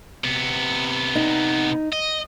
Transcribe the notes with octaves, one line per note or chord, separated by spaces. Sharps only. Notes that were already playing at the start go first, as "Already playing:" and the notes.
C3 B3
D#4
D#5